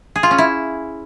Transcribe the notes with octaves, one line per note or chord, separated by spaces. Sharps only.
G#4
F4
C#4
E4